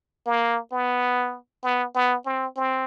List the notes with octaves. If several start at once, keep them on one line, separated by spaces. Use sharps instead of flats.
A#3
B3
B3
B3
C4
C4